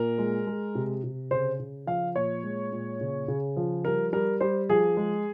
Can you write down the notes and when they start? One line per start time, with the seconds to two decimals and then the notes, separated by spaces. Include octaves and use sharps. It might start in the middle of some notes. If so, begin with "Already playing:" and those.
Already playing: A#2 A#4
0.18 G#3
0.47 G#3
0.75 C3
1.04 C3
1.31 C#3 C5
1.59 C#3
1.87 F3 F5
2.16 A#2 C#5
2.44 G#3
2.72 A#2
3.01 C#3
3.28 C#3
3.57 F3
3.85 G3 A#4
4.13 G3 A#4
4.41 G3 C5
4.69 F3 G#4
4.97 G#3